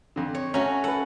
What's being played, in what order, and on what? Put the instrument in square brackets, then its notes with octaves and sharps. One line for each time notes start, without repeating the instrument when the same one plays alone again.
[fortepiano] F2 D3
[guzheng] C#5
[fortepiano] A3 C#5 A#5 [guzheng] C#4 F#4
[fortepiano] A4 B4 [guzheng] F#5